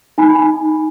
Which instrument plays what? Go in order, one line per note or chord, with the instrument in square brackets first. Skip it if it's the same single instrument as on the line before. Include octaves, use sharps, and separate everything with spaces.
[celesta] D#4 G#5 B5